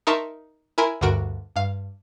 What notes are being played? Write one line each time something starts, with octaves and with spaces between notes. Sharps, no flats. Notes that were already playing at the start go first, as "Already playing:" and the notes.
D#4 A#4 E5 A5 C6 C#6
E4 A#4 G#5 B5 C6
D2 G2 D3 F#4 A#4 D7
G2 F5